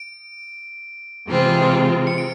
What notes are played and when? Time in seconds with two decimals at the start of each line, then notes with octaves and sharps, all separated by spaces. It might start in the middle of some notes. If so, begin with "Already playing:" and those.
Already playing: D7
1.27 C3 E3 G#3 C4 F4
2.07 C#7
2.18 D7